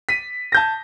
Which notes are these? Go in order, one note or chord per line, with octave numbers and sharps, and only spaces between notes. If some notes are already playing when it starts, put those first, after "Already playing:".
B6 D#7
A5 G6 A#6